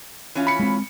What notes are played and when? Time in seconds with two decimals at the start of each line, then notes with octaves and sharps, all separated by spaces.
0.35 E3 C#4 F4
0.47 B5 C#7
0.59 G#3 C4